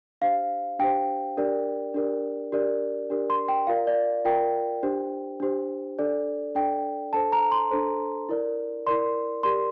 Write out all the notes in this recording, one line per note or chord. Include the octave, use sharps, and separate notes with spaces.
D4 G4 C5 F5
D4 G4 C5 G5
D4 G4 A#4 D5
D4 G4 A#4 D5
D4 G4 A#4 D5
D4 G4 A#4 D5
C6
G5
F4 A#4 D5 F5
D5
F4 A#4 D5 G5
D4 G4 C5
D4 G4 C5
D4 A4 D5
D4 A4 D5 G5
D4 A4 C5 A5
A#5
C6
D4 A4 C5
E4 A#4 D5
E4 A#4 D5 C6
G4 A#4 D5 C6